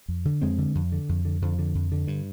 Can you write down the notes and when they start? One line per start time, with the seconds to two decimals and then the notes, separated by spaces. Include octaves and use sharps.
0.08 F2
0.25 D3
0.42 F2 G#3 C4
0.58 D3
0.75 F2
0.92 D3
1.09 F2
1.25 D3
1.42 F2 D3 F3
1.59 D3
1.75 F2
1.92 D3
2.07 G2